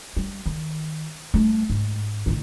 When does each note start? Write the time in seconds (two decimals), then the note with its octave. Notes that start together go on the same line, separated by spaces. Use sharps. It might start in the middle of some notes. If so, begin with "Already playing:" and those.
0.17 G3
0.46 D#3
1.34 G3 A3
1.70 G#2
2.26 A1 D3